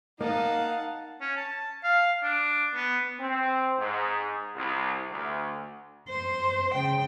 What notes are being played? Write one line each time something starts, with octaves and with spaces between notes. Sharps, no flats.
A#3 D#4 D#5 F5 F#5 A5
C#4
A5
F5
D4
B3
C4
G#2
C2
D2
C5
C#3 G5